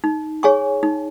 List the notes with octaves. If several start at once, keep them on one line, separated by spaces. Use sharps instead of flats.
D#4
G#4 C#5 G#5 C#6
D#4